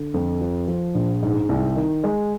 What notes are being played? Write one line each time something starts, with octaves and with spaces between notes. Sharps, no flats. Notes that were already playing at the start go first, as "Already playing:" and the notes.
Already playing: D3
F2
F3
F3
A#1
G#2
C2
D#3
G#3